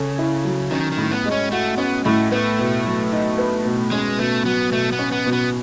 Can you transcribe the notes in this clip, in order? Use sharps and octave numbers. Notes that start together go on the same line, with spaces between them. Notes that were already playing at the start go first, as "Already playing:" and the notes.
Already playing: C#3 C#4 A4
E4
F#3
D#3 C#4
D#3
A2
B3
G#3
C#4
A3 F#4
B3 C#4
A2 A3
A3 B3
B2
F#3
D#4
B3
B2
G#3 C#4
B2 A3
F#3 B3
B2 A3
B3
C#4
B3
B2
B3